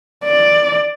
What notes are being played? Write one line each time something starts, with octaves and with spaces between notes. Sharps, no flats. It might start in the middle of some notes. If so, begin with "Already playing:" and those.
D5